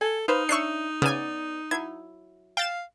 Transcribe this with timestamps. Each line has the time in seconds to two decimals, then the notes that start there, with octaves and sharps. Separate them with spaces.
0.01 A4 G#5
0.28 D#4 B4 C5 F5
0.49 D4 C#5 E5 C#6 F#6 C7
1.02 C#3 B3 D5 G#5
1.71 F#3 E4 G#6
2.57 F5 G5 A6 E7